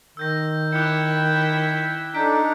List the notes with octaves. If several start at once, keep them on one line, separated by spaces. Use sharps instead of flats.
D#3 E6 G6 A#6
E4 G5 D6 F#6 C#7
D4 D#4 A4 G6 B6 D7